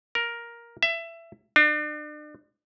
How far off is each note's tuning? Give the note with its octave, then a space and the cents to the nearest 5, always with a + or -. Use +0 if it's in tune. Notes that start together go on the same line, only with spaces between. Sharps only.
A#4 +10
E5 +20
D4 +40